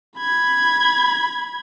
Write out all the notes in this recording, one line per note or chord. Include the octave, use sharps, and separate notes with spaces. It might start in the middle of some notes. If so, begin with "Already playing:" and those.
B5 G#6